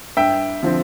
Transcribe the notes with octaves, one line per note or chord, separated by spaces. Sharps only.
G2 E5 G5
D3 F3 C4